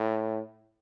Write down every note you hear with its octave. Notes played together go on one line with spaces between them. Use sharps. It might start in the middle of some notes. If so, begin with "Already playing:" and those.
Already playing: A2